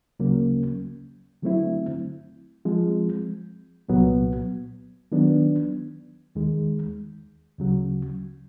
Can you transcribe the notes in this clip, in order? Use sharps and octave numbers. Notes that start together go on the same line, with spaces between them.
D2 C#3 F#3 A#3 C#4
D3 F#3 A3 C4 E4
F3 G#3 C4
C2 A#2 F#3 B3
D#3 F#3 B3 D4
D#2 D#3 G#3
D2 C#3 F#3